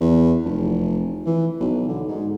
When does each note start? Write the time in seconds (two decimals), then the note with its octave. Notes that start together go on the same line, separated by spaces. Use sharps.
0.01 E2
0.45 F1
1.26 E3
1.60 B1
1.88 D3
2.08 G#2